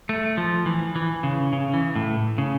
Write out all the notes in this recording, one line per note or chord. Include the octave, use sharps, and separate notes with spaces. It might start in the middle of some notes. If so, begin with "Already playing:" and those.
A3
F3
E3
E3
C#3
C#3
E3
A2
C#3